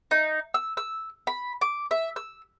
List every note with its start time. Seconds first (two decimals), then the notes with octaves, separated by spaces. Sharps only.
0.11 D#4
0.54 E6
0.77 E6
1.27 B5
1.61 D6
1.91 E5
2.16 E6